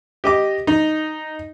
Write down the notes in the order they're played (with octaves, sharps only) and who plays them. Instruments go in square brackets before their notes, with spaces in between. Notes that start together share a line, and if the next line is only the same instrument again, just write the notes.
[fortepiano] G4 D#5 D6
D#4